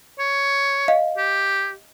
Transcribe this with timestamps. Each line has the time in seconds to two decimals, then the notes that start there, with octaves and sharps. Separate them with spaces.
0.19 C#5
0.88 D#5 F5
1.18 G4